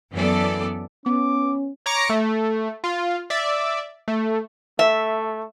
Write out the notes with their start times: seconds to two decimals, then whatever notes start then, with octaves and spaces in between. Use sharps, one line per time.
0.12 F#2 E3 F#3 B3 A4 D5
1.06 B3 C#4 D6
1.86 C#5 A#5 D6 A#6 C#7
2.09 A3
2.84 F4
3.30 D5 E5
4.08 A3
4.79 A3 E5